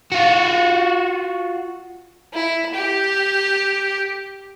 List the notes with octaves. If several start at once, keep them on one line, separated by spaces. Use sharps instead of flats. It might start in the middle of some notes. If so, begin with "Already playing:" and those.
F4 F#4
E4
G4